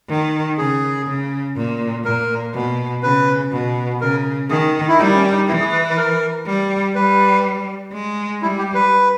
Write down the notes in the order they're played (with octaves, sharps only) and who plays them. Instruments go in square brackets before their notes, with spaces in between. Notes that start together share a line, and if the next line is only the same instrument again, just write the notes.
[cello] D#3
[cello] C#3 [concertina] G#4
[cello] C#3
A#2
[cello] A#2 [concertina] A#4
[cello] B2
[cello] C#3 [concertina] B4
[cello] B2
[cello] C#3 [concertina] A#4
[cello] D#3 [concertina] G#4
[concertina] E4
[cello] G3 [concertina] D#4
[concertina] C#4
D#4
[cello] E3 [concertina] E4
[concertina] G#4
B4
B4
A#4
[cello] G3
[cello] G3 [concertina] B4
[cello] G#3
[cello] G3 [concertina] E4
[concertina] G4
B4